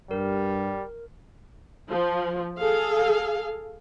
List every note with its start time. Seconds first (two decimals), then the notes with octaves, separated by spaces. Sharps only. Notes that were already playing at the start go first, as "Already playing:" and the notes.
0.11 G2 G3 A#4
1.89 F3
2.60 G#4 A4 F5